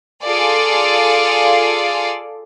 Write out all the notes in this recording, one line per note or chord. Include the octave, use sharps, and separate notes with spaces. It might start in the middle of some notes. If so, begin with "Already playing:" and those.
F4 G#4 A4 D5 F5